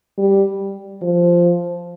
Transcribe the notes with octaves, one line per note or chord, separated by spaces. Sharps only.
G3
F3